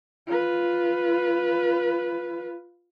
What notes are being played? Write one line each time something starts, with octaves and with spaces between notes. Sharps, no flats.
F4 B4